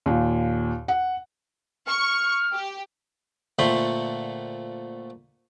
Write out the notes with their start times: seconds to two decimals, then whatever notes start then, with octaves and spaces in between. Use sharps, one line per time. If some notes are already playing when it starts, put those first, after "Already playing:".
0.06 D#2 A#2
0.88 F#5
1.87 C#6 F6
2.53 G4
3.59 A#2 D3 A3 C4 B5 C6